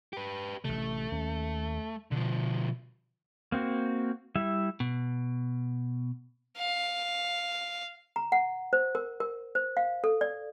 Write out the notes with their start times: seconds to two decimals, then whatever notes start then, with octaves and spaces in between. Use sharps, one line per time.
0.13 G4 B4
0.64 A1 C3 A3
1.12 D#2 C#4
2.11 B2 D3 F3
3.52 A#3 C4 F#4
4.36 G3 E4 E5
4.80 B2
6.58 F5
8.16 A#5
8.32 F#5
8.73 C5
8.95 A#4
9.20 A#4
9.55 C5
9.77 F5
10.04 A4
10.21 D5